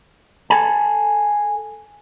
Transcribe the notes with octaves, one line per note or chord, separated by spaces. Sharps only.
A4 G#5 A5